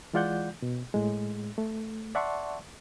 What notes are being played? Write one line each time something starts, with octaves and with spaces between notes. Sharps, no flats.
E3 G#3 F4 D5 F#5 G6
B2
A2 G#3
A3
D5 E5 F#5 A5 C6 C#6